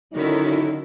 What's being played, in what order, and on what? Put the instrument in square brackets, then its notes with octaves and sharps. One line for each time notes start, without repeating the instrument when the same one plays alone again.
[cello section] D3 C#4 E4 [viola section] D#3 F#4 A4 [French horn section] F#3 D#4